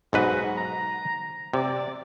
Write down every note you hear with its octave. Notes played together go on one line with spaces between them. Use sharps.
B1 G#2 F#4 B4
A#5
C3 D5